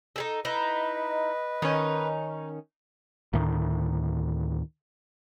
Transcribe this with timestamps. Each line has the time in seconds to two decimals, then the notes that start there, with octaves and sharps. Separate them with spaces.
0.16 D#4 G#4 A4
0.45 D#4 E4 B4 D#5
1.62 D#3 C#4 D#4
3.33 D2 A2 D#3